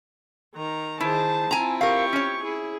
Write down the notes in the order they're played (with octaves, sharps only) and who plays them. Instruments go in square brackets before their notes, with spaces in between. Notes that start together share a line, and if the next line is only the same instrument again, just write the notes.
[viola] D#3 A#5
[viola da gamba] D#3 G#4 C5 [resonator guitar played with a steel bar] E4 [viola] A5
[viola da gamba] C4 E4 F4 [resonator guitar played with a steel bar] G#5 A#5
[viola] G4 C#6 [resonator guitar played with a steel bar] A#4 F5
[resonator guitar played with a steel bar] C#4 C#5
[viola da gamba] E4 [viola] G#4